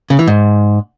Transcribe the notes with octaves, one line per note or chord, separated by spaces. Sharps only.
C#3
E3
G#2